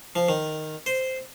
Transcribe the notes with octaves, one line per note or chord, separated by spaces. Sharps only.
F3
D#3
C5